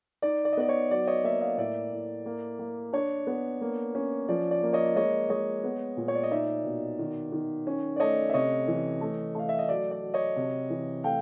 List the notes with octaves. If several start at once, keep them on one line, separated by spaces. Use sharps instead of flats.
D#4 D5
D5
D#5
B3 D5
C#5
F#3 D5
C#5 D#5
A#3 D5 E5
D#5 F5
A2 D5 E5
A2
A#3
A#3
D4 C#5
B3
A#3
C#4
F3 D5
D5
A#3
C#5 D#5
G#3 C#5 D#5
G#3 C#5 D#5
B3
A#2
C#5
D5
D#5
D#4 D5 E5
B2
D#3
D#3
C#4
D5
A3 C#5 D#5
E5
C3 C#5 D#5
E3
A3
A3 F5
E5
D#5
F#3 D5
D5
F#3
C#5 D#5
C3
E3
A3 F5 G5